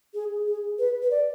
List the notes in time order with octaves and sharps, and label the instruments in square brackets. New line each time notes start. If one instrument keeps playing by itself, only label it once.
[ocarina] G#4
G#4
B4
B4
D5